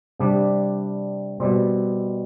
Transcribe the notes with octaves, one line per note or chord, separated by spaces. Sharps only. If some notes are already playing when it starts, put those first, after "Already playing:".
C3 G3 D4
B2 G3 C4